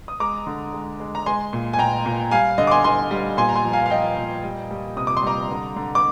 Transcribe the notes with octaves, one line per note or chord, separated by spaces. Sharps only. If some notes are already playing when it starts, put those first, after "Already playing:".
D#6
G#3 A#5 D6
D3
G#3
G#3
A#5
G#3 G#5 C6
A#2
G#5
A#2 G5 A#5
A#2
G3 F5 G#5
D3 D#5
D6
G#5 C6
D3 G#5 C6
G3
A#2 G#5 C6
A#5
G#5 C6
F3
F5 G#5
F5
F3 D#5 G5
A#2
G3
G3
C3 D#6
D6
C6
G3 A#5 D6
D3
D3
D6